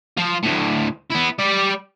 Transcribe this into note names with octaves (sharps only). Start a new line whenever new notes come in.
F3 F4
D2 A2
B3 E4
G3 D5